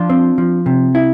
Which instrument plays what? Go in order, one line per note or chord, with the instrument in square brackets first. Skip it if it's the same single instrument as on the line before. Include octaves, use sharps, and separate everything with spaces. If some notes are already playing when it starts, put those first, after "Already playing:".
Already playing: [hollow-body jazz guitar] F3 D4 F4
C4
F3
C3
E4